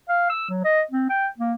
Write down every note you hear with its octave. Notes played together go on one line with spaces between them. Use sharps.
F5
E6
F#3
D#5
C4
G5
A#3